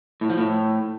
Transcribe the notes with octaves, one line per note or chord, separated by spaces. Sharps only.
A2
F3
A2